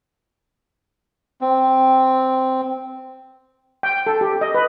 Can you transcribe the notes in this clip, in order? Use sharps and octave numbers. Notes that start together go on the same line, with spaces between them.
C4
G5
A4
G4
D#5
B4